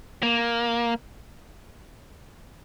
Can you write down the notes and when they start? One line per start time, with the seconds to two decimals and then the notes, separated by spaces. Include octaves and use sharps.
0.23 A#3